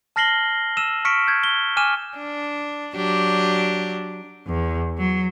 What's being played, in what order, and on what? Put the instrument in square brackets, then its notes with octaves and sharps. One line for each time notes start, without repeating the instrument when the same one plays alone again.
[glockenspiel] A5 F6 A#6 C7 F#7 G7
E6 D#7 E7
C#6 F6 B6 C#7 D7
G6 G#6
G7
G#5 D6 F6 D#7 E7
[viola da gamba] D4
F#3 D4 G4
[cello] E2
F#3